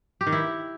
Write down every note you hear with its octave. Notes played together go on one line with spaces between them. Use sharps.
G4
D#3
E4